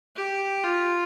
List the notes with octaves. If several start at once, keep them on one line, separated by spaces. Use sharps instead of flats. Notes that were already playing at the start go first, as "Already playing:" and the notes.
G4
F4